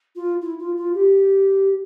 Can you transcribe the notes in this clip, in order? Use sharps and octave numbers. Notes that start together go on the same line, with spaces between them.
F4
E4
F4
F4
G4